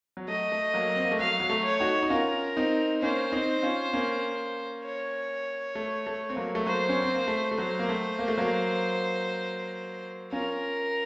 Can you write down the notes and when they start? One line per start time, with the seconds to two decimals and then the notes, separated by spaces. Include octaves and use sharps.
0.17 F#3
0.28 A3 D#5
0.52 A3
0.74 F#3 A#3
0.96 C4
1.05 A#3
1.12 A3
1.19 F#3 F5
1.40 F#3
1.50 A3
1.65 C#5
1.80 D#4 F#4
2.03 D#4
2.10 C#4 F4 A#4
2.57 C4 D#4
3.02 A#3 C#4 C5
3.32 C4 D#4
3.63 C#4 F4
3.93 A#3 C#4
4.84 C#5
5.75 A3
6.07 A3
6.30 C4
6.36 F#3 A#3
6.55 A3
6.67 F#3 A#3 C5
6.89 C#4
7.02 C4
7.15 A#3
7.28 A3
7.51 A3
7.58 F#3 C5
7.79 A#3
7.89 A3
8.19 A#3
8.28 A3
8.37 F#3 A#3
10.32 C#4 F4 A#4